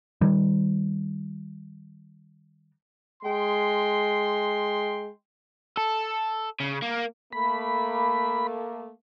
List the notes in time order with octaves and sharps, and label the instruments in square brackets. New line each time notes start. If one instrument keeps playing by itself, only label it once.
[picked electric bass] D#3 G3
[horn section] G#3 G5 C6
[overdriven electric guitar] A4
C#3
A#3
[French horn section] A3 A#3 [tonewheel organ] B5